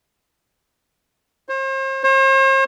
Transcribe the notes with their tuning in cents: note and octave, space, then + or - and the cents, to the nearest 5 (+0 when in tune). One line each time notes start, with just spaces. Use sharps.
C5 +40
C5 +45